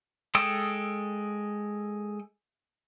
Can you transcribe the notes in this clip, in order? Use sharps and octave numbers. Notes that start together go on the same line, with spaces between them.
G#3 A4 G5 D#6 E6